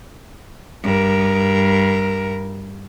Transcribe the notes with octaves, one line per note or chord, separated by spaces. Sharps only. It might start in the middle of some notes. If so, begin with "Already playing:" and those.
G2 A#4